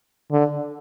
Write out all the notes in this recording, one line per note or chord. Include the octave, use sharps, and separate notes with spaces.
D3